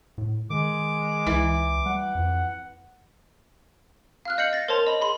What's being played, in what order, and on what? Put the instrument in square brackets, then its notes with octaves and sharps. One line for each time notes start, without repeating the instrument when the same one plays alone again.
[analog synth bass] A2
[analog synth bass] D#3 [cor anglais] G#3 [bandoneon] D6
[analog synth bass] C#2 [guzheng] E3
[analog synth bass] G3 [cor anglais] F#5
[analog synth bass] F2
[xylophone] F5 F6 F#6
D#5 G6 C7 C#7 F#7
A6 A#6
A#4 C5 C#5 A5 C6 F7
D#5 B5
G#4 B5 C6